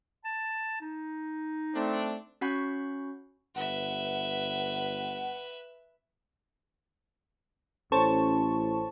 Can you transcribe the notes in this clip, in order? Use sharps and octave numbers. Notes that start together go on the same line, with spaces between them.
A5
D#4
A3 C4 D4
C#4 F#4 F#5 B5 C#6 G6
G1 B4 E5 F#5
A1 C#4 A4 C5 A5 C#6